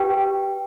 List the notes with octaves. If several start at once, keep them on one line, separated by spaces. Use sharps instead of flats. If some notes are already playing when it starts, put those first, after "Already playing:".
Already playing: G4 B4 G5